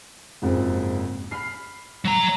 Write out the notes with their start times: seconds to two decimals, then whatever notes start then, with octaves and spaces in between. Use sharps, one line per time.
0.42 F#1 F2 G#2
1.31 B5 F6 C7
2.05 F#3 A#5